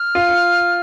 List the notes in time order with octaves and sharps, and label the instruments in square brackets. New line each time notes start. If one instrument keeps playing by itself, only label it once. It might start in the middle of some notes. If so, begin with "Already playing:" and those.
Already playing: [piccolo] F6
[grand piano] F4